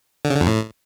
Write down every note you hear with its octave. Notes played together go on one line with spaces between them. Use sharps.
D3
C#3
D3
F2
A2